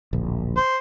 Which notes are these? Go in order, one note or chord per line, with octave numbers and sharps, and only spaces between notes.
D1 A#1
C5